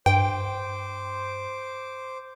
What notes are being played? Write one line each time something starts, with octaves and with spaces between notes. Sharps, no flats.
G2 C5 G5 D6